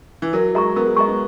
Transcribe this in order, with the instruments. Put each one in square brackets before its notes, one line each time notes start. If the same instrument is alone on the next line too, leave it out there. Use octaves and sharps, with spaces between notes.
[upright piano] E3
[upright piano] F#3 [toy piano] A#4
[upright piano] G#3 [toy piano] D#5 A#5 C#6
[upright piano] B3 [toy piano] A#4
[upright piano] G#3
[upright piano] G#3 [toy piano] D#5 A#5 C#6
[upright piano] B3